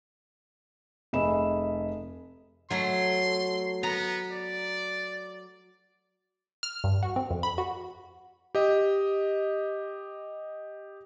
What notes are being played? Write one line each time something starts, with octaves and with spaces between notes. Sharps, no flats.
F1 G#4 D#5 E5 B5 E7
F#3 A3 C6
B3 A#5
D5
F6
G2
F#4
C4
F2
B5
F#4
G4 D#5